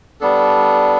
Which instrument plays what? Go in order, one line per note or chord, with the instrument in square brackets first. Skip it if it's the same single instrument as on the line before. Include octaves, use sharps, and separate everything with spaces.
[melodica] G3 B3 D4 A4